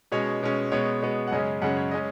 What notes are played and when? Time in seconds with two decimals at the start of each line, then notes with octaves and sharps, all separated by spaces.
0.12 B2 G#3 C#4 C#5
0.43 B2 G#3 C#4
0.72 B2 G#3 B3 C#5
1.02 B2 G#3 B3
1.27 F#5
1.31 F#2 C#3 G#3 C#4 D#5
1.62 F#2 C#3 G#3 C#4 F#5
1.77 C#5
1.91 G#3 C#4 D#5